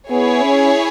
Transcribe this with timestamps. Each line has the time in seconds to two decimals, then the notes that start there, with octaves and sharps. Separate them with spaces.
0.10 B3 E4 G#4 C#5 G#5
0.43 C#4